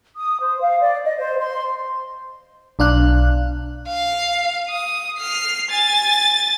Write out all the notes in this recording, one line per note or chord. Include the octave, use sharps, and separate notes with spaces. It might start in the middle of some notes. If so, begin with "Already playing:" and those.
D#6
C5
F5
D5
D#5
C5
C6
B1 D4 F5 F#6
F5
D#6
F6 C7
G#5 A6